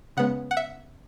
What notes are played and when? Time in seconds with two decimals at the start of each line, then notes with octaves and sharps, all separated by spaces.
0.17 C#3 G#3 B3 F#5
0.51 F#5
0.57 E5